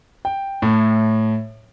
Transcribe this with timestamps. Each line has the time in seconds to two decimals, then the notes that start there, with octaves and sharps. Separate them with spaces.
0.25 G5
0.62 A2